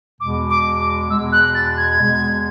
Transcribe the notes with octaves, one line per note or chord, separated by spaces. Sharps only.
E2 B2 G#3 D6
D6
D6
E2 B2 G#3 E6
F#6
A6
G#6
E2 B2 G#3